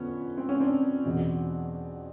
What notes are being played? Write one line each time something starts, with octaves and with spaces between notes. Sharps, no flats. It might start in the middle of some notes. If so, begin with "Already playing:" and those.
Already playing: F2 D3 B3 C#4
C4
C#4
C4 D4
E2 B2